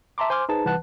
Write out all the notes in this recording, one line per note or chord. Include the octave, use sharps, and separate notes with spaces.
E5 A5 A#5 C6 D6
C5 G#5 C6 D6 F6
D#4 G#4 B4 C5 A5
C2 E3 B4 F#5 A5 F#6